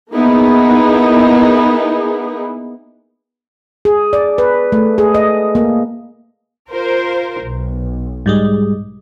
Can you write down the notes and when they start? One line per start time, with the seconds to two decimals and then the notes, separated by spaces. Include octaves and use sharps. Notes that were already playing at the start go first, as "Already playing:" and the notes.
0.12 A#3 B3 D#4 E4 G#4
3.85 G#4
4.13 D5
4.38 B4
4.72 A3
4.98 G#4
5.14 D#5
5.55 A#3
6.70 F4 A#4 C5
7.43 B1
8.26 G#2 G3 G#3